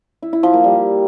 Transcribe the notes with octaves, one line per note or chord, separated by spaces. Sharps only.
E4
E4
F3
A#3
G3